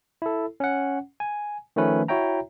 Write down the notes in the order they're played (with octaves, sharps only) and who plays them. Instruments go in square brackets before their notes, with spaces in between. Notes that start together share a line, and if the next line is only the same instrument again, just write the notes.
[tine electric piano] E4 A4
C#4 F#5
G#5
D#3 F3 A3 C#4 B4
E4 F#4 C#5 E5 G5 A#5